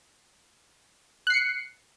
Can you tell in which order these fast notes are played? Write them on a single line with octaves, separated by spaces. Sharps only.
F#6 C7 C#7